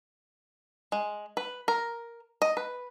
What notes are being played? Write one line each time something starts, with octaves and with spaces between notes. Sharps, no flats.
G#3
B4
A#4
D#5
B4